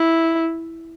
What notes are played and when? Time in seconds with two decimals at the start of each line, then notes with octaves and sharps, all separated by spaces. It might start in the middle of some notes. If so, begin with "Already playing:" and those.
Already playing: E4